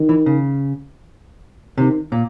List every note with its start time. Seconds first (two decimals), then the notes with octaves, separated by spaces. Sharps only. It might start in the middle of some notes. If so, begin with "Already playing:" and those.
Already playing: D#3
0.09 E3
0.26 C#3
1.78 C3 D#3
2.12 A#2